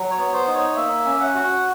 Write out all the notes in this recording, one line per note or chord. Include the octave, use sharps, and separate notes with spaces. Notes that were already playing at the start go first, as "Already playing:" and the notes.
Already playing: F#3
C#5
B3
C5
D#4
C#5
A#3 E5
C#4
F#5
F#4